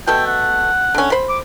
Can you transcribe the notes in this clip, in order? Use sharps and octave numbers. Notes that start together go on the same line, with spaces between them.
B2 A3 A4 G5
F#5
D3 C#4
C5 B5
D6